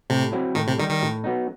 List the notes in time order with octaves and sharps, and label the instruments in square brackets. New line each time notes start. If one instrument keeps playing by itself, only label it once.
[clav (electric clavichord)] A2 [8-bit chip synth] C3
[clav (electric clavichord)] F#3 C4 E4
[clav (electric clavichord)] A2 [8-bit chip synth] D#3
[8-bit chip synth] C3
[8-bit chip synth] D#3 [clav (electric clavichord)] G3 D#4
[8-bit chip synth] D#3
[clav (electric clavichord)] A2
F#3 B3 D#4